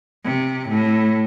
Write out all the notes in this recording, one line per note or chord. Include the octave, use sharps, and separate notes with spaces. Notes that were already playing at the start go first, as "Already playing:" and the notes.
C3
A2